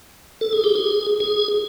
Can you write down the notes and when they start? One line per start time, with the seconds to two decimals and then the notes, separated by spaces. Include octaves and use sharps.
0.41 A4
0.53 G#4
0.64 G4
0.75 G#4
1.20 G#4